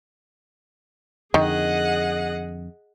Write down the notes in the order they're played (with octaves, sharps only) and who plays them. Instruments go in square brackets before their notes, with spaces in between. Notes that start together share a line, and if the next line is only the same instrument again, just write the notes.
[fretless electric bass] F2 D3 [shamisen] D#3 [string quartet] G#4 D#5 F#5